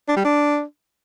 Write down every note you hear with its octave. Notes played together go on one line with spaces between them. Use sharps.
D4
G3
D4